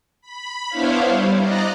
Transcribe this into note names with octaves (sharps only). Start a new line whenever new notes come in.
B5
B3 D4 E4 C5 C#5 F5
G3
D5 D#5 A#5 F#6